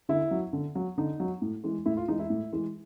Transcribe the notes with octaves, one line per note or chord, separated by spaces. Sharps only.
D3 E4
F#3
D3
F#3
D3 D#4
F#3
A2
E3 G#3
A2 E4
F4
E3 G#3 D#4
E4
A2
E3 G#3